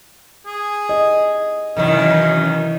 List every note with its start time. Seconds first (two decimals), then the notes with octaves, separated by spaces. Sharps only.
0.46 G#4
0.89 D#5
1.77 F#2 C3 D#3 E3 C#4 D#5